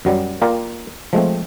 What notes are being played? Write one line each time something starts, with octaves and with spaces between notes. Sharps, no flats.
F#2 F#3 G3
A#3 F4 A#4 D5 G5
F3 G#3 A3 C4